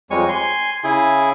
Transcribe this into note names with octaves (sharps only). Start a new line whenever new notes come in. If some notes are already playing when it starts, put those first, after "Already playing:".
F2 G3 G#3 C#5 G#5 C#6
G#5 C6
C#3 E4 G#4 G#5